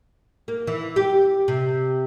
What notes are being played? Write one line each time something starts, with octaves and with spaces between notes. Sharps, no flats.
A#3
E3
G4
C3